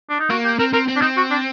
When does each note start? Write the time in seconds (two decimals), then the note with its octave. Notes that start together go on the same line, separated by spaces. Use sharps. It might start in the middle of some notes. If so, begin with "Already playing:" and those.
0.09 D4
0.20 D#4
0.30 A#3 F#4
0.45 G4
0.59 C4 A#4
0.73 C4 A#4
0.88 C4
0.96 D4
1.01 C4 D#4
1.17 F#4
1.31 D4